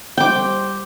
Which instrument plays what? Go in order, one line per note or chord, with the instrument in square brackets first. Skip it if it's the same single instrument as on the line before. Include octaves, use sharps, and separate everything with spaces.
[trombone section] G3 C5 [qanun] G5 D6